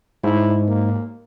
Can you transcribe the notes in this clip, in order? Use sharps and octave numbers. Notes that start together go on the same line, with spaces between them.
G#2 E4
A#3